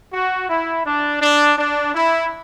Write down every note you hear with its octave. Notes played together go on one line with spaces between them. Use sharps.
F#4
E4
D4
D4
D4
E4